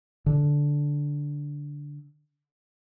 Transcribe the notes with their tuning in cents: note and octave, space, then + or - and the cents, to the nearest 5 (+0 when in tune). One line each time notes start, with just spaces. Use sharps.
D3 -10